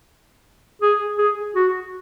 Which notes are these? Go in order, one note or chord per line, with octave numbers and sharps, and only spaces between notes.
G#4
G#4
F#4